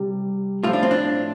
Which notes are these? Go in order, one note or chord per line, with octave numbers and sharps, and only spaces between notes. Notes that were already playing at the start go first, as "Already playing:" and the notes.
Already playing: C3 G3
A2 F3 F4
D4
C4
D4